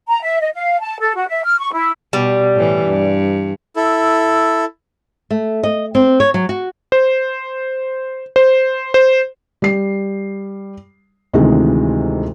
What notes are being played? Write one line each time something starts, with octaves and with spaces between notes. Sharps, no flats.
A#5
E5
D#5
F5
A5
A4
F#4
E5
F6
C#6
E4
B2 G3
A2 E3
G2
E4 A4
A3
D#5
C4
C#5
F#3
F#4
C5
C5
C5
G3 C7
D2 C3 D#3 E3 G#3